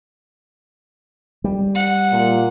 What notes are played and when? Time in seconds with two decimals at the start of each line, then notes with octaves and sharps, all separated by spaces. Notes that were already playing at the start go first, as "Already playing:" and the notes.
1.44 G3
1.75 F#5
2.12 A#2